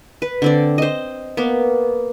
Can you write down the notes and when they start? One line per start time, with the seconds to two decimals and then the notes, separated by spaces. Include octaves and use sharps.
0.22 B4
0.42 D3 C4 D5
0.78 C5 D#5
1.37 A#3 B3